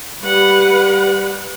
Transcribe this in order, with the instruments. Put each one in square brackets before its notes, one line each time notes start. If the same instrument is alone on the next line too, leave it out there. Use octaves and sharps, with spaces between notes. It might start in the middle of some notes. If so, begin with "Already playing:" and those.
[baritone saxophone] G3 [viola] B4 F#5